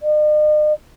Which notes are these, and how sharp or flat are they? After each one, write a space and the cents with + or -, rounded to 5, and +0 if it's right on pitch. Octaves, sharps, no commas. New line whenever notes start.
D#5 -45